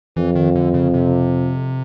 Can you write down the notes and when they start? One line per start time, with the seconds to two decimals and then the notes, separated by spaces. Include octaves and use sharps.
0.16 F2 E3
0.35 D#3
0.56 D3
0.74 C#3
0.94 C3